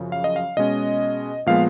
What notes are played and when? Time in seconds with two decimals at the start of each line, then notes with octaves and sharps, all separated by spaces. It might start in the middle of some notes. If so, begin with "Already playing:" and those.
Already playing: F#2 C#3 F3
0.12 F5
0.24 D#5
0.36 F5
0.57 B2 G#3 C#4 D#5
1.46 A#2 F3 G#3 B3 F5